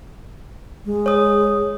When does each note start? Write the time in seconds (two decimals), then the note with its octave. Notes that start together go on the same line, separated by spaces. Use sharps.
0.85 G#3
1.06 C#5 D#6